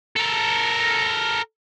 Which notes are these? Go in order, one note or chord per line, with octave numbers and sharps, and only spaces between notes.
A4 A#4